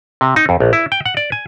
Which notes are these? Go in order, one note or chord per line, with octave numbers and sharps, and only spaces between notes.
C3
D#4
F2
A#1
E4
G5
F#5
D5
G#5